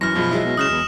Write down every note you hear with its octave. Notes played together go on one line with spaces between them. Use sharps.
F#2 E3 F6 A#6
F#2 B2 F3 G#3
F#3 G#3 E4
B2
C#3 D#6 F6 E7
E2